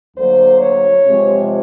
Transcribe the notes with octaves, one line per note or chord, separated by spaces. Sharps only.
D2 D3 F#3 A#3 C5
C#5
C3 F3 G#3